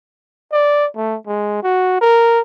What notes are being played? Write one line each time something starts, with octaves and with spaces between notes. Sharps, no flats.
D5
A3
G#3
F#4
A#4